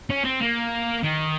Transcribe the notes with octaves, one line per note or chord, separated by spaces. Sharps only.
C#4
C4
A#3
D#3